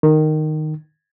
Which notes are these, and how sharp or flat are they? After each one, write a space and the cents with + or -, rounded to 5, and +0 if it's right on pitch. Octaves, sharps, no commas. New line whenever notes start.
D#3 -10